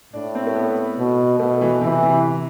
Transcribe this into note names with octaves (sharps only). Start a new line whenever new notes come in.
A2 D4
C4
A3
B3
B2
B2 A3
E3
C3 E3
C3